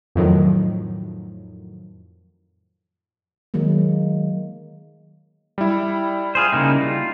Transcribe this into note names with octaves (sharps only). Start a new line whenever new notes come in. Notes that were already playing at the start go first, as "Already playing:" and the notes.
F2 A2 D#3 F3 F#3
D#3 F#3 G#3 A#3
G3 E4
F4 G#4 C5
C#3 A#3 D#4
F4